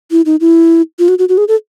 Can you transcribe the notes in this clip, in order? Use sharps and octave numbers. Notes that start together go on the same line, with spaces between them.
E4
D#4
E4
F4
F#4
F#4
F#4
G#4
A4